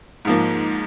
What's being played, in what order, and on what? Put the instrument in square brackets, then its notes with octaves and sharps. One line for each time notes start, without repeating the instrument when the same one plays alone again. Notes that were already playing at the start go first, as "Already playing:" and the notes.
[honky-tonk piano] G#2 F3 A#3